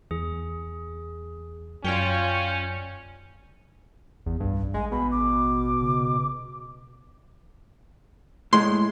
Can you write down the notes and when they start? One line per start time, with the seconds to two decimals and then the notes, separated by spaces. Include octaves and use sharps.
0.11 E2 G#4
1.84 F#2 C#4 F4 C#5 D5 G5 G#5
4.26 G#1 E2
4.40 C2 G2
4.74 A1 G#3 G#5
4.92 B2 B5
5.11 D6
5.82 C#3
8.53 A2 G#3 C6